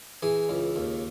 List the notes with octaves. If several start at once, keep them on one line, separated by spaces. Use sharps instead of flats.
E3 G#4
C#2
D#2